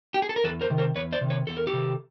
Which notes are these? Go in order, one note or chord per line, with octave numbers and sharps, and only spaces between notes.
G4
G#4
A4
A#4
E2 A4 B4
A#4 C5
C3 D#3
A#4 C5
E2 B4 C#5
C5 D5
C3 D#3
B4 C#5
E2 A4
A#4
G4 A4
C3 D#3